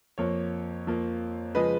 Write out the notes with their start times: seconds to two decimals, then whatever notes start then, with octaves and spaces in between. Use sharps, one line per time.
0.18 F2 F3 A#3 C#5
0.87 F2 F3 A#3
1.55 C#3 F3 G#3 B4 D#5